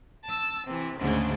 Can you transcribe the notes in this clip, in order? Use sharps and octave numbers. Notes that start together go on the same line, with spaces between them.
A5 E6
C3 E3
D2 G#2 C#3 D4